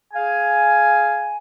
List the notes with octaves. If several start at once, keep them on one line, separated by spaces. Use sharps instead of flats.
G#4 F5 G#5